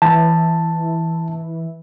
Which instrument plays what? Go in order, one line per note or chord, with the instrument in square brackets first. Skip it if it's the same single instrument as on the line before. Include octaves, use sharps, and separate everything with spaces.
[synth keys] E3 [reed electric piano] A5